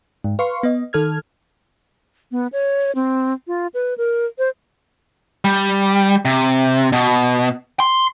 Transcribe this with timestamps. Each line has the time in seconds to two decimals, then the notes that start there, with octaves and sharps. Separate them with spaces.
0.24 G#2
0.39 B4 F5 C6 C#6
0.63 B3 D#5
0.93 D#3 A4 F6 G#6
2.31 B3
2.52 C#5
2.95 C4
3.47 F4
3.74 B4
3.98 A#4
4.38 C5
5.45 G3
6.25 C3
6.92 B2
7.80 C6